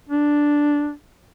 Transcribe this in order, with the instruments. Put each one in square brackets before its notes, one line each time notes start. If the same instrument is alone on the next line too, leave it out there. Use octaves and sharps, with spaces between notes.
[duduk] D4